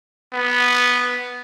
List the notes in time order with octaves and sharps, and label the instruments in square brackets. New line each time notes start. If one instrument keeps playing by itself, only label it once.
[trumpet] B3